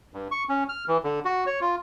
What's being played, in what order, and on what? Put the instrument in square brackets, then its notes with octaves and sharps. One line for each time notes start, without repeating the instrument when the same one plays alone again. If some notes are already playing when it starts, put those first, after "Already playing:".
[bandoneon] G2
C#6
C#4
F6
E3
D3
F#4
C#5
F4